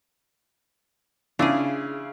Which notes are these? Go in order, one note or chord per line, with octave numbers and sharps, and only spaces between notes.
C#3 D4 E4 F4 G#4